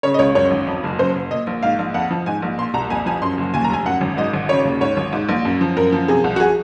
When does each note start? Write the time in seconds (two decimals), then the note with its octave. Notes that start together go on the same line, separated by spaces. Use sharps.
0.03 C#3 C#5
0.14 D#5
0.19 C#2 C#5
0.35 F#2 C#5
0.51 G#1
0.67 F2
0.84 F#1
0.99 F#2 C5
1.15 F#1
1.31 A#2 D#5
1.47 A#1
1.63 G#2 F5
1.79 A#1
1.94 F2 F#5
2.11 F3
2.26 G#2 G#5
2.42 A#1
2.58 A#2 C6
2.74 C2 A#5
2.90 F2 G#5
3.06 F3 G#5
3.22 F#2 C6
3.38 F#1
3.54 D#2 G#5
3.64 A#5
3.70 F1 G#5
3.86 F#2 F#5
4.01 G#1
4.17 G#2 D#5
4.34 G#1
4.49 C#3 C#5
4.65 D#2
4.81 G#2 C#5
4.97 G#1
5.13 G#2
5.29 A#1
5.45 F#2
5.61 F3
5.77 F#2 A#4
5.93 F3
6.08 C3 G#4
6.24 C2
6.36 F#4
6.40 G#4